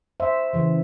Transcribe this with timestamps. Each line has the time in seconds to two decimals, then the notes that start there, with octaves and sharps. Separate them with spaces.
0.20 C5 E5
0.53 C#3 E3